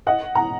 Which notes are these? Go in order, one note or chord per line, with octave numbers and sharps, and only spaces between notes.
D#5 F#5
F#5 A#5